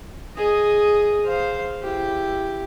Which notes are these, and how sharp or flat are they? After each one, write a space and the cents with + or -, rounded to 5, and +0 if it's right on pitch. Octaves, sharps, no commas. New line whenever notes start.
G#4 +0 D#5 +0
C5 +0 F5 +0
E4 +15 G4 +0